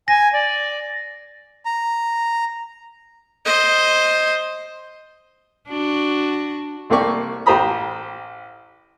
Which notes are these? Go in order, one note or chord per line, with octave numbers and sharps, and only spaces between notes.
G#5 A#6
D5
A#5
C5 D#5
D4 F#4
C2 A3 A#3 C4 D5 C#6
A1 G4 C5 A#5 B5 D#6